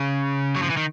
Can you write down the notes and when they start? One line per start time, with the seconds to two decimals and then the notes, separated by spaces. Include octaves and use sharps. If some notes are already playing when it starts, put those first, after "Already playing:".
Already playing: C#3
0.56 F#3
0.63 F3
0.70 E3
0.77 D#3